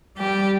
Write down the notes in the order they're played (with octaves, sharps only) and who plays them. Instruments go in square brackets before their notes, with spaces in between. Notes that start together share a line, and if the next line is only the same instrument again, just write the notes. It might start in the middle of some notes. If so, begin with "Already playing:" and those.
[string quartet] G3 G4